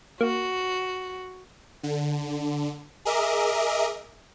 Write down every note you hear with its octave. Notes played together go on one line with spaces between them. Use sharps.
A#3 F#4
D3
G#4 A#4 D#5 E5 D6